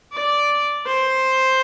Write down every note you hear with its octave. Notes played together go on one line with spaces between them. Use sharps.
D5
C5